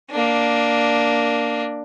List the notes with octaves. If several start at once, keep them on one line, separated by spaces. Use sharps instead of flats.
A#3 D4